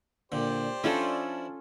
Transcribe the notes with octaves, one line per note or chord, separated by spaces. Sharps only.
A#2 D3 G4 C5 D5
F3 C#4 D4 E4 F4 A4